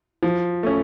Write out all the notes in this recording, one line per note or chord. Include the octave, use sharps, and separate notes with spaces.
F3
A3 C#4